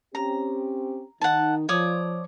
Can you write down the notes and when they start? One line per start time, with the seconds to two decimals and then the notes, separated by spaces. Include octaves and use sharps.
0.15 C4 C#4 G4 A#5
1.21 D#3 D#4 F#5 A5
1.69 F3 C#5 D5 D#6